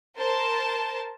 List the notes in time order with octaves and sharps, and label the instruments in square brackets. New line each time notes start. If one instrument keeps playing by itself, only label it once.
[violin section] A#4 C5 A5